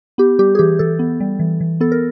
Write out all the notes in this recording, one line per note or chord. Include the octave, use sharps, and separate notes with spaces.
B3 G4
G3 G4
G#4
E3 G4
E3 A4
B3
G3
E3
E3
B3 A4
A#4